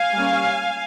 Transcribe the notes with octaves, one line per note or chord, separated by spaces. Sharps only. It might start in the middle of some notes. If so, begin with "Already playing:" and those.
Already playing: F5 G#5
G3 A#3 C#4